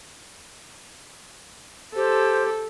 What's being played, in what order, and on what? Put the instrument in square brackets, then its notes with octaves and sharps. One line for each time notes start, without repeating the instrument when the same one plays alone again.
[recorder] G4 [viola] A4 [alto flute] C5